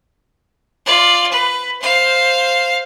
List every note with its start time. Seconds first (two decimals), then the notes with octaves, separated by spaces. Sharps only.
0.86 F4 D5
1.32 B4
1.81 C5 F5